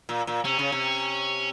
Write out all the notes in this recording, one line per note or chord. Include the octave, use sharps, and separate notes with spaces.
A#2
A#2
C3 C#4
C#3
C3